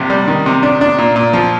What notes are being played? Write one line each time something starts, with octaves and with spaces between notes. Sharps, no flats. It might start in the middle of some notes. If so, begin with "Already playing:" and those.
Already playing: A#1 C3
G3
D#3
C3
D4
D4
A#2
A#2
F3